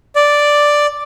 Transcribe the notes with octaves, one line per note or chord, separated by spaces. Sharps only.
D5